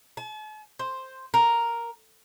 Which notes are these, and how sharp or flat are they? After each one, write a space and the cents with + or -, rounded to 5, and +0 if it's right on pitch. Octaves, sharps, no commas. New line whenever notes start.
A5 -45
C5 +5
A#4 +0